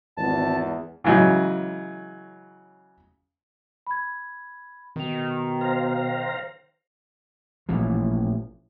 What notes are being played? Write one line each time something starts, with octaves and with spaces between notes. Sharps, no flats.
G#1 E2 A5
C#3 E3 F#3 G#3 D#4
B5 G#6
B2 D#3 A#4 F7
C5 F5 A#5
A1 A#2 E3 F3